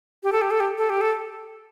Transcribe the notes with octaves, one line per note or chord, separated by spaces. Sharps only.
G4
A4
G4
A4
G4
A4
G4
A4